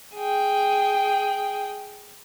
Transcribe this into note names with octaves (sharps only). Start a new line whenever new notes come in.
G#4 G5